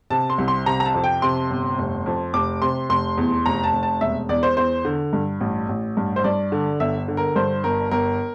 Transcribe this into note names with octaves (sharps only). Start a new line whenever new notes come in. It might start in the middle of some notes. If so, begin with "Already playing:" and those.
C3 A5
C6
C2
C6
C3 A#5
A#5
A5
F2
G5
C3 C6
G1
F1
F2
F1 D6
C3 C6
F1 C6
E2
F1 A#5
A5
F1
A5
E1 E5
E2 D5
C5
E2 C5
D3
G2
A1
A1
G2
C5
G2 D5
D3
G1 E5
D3
A#4
G2 C5
G1 A#4
G1 A#4